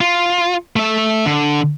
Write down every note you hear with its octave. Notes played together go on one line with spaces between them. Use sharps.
F4
A3 E5
D3